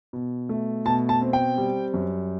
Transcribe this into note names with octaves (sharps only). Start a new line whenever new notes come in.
B2
A3
B2 A5
A5
C4
G5
G3
F#2